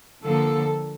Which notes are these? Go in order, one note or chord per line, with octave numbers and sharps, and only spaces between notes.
D3 F3 A#3 A4